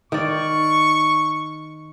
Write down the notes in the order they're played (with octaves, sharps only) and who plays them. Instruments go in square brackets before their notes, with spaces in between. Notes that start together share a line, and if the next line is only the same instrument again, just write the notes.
[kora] D#3 D5 [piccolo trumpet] C#6